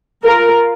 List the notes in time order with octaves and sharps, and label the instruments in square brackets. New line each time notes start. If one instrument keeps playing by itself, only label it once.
[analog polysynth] F4 [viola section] A#4
[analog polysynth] F4